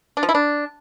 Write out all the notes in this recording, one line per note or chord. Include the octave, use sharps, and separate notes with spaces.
D4
F3
E4
D4